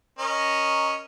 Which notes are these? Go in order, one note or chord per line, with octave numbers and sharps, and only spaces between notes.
C#4 A#4 D#5